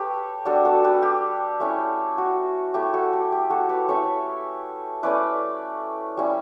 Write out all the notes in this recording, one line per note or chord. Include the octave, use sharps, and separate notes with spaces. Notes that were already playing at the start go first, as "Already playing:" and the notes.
Already playing: G4 A4 B4 C#5
G3 D4 F#4 A4
F#4 A4
G4 B4
G4
A3 C#4 E4
F#4
A3 E4 G4
F#4 A4
G4
G4
F#4 A4
G4 B4
A3 C#4 E4 A4 C#5
A3 C#4 E4 B4 D5
G3 C#4 E4